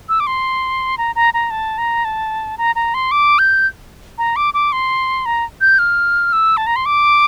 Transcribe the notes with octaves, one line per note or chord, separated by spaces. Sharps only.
E6
D6
C6
A#5
A#5
A#5
A5
A#5
A5
A#5
A#5
C6
D6
G6
A#5
D6
D6
C6
A#5
G6
F6
E6
A5
A#5
C6
D6